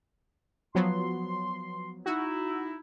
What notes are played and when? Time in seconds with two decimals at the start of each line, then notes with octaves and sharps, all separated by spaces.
0.75 F3 F#3 B3 C6
2.06 D#4 E4 F#4